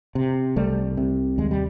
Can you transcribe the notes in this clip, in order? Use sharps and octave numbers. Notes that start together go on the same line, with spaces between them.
C3
C2 G3 A3
C3
D#2 G#3
G3